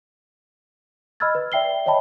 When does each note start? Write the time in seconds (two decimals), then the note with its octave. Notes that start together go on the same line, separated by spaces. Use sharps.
1.20 D#5 B5 E6 F6 G#6 A6
1.35 B4
1.52 D5 E5 G5 C7 G7
1.86 C#5 D#5 E5 G5 A5 B5